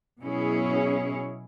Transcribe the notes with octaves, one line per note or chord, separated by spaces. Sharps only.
B2 F#3 C#4 E4 G#4 C#5